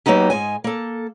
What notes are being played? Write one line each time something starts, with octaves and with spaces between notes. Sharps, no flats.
F#3 A#3 B3 D#4 G4
G#2 G#3 G#5
A#3 A4